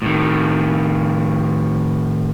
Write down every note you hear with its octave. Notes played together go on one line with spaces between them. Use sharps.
A2 D#3